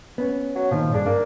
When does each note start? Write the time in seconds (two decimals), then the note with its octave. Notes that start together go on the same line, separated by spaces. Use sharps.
0.18 B3 C#4
0.55 F#3
0.71 A#2 D3 D#3 F3
0.94 G2 D4 G#4 D5
1.06 A#3 D4